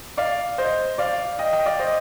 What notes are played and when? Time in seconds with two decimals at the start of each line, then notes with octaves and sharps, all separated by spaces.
0.17 D5 F5
0.58 C5 D#5
0.98 D5 F5
1.39 D#5 G5
1.52 D#5 G5
1.65 D5 F5
1.79 C5 D#5